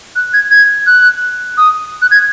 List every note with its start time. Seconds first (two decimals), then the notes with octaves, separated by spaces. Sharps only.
0.16 F#6
0.33 G#6
0.51 G#6
0.87 F#6
1.58 D#6
2.02 F#6
2.11 G#6